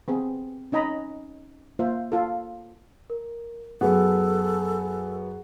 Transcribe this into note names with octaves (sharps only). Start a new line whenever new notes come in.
B3 C4 G#4
C#4 D#4 D#5 A#5 B5
A#3 F4 C5 E5
F4 A4
A#4
F#2 B3 G#4 A4 F#5